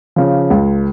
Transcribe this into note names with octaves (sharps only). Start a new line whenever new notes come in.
C#3 F3
C#2